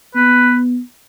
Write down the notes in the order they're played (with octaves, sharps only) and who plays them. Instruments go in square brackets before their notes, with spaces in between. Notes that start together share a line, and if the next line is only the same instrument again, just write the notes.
[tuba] B3 [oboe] B4